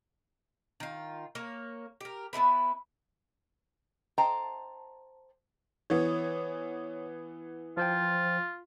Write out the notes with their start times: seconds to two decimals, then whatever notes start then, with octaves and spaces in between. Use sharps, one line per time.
0.80 D#3 F4
1.35 A#3 C#5
2.01 G4 A#4
2.33 B3 D#4 E4 B4
4.18 C5 D#5 G5 A5 A#5
5.90 E3 B3 C#5
7.77 F3 F4 C5 G5